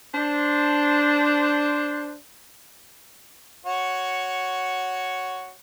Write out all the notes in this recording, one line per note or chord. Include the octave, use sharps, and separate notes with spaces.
D4 C5
F#4 C#5